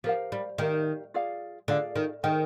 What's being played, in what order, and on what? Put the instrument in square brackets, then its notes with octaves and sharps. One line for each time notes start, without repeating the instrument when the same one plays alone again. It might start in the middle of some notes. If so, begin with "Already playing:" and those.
[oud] F3 [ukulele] G4 A#4 F5
[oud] G3
[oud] D#3 [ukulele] G4 A#4 F5
[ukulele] F4 G#4 D5 F5
[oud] D3 [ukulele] F4 G#4 D5 F5
[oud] D#3
[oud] D#3 [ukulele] G#4 C5 D#5 G5